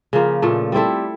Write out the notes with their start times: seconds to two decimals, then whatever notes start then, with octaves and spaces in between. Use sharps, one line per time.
0.13 C#3 F3 A#3
0.42 A#2 F3 A3
0.72 G3 C4 E4 A4